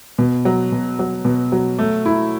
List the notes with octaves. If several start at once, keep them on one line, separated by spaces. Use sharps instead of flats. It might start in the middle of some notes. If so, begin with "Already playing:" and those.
B2
F#3
B2
F#3
B2
F#3
A3
E4